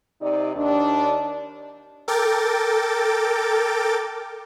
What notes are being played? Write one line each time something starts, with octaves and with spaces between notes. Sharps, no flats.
C3 D#4 D5
D#2 D4
A4 A#4 G5 D6 A6